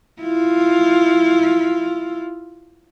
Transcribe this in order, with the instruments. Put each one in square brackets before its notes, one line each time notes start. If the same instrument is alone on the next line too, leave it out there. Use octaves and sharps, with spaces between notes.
[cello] E4 F4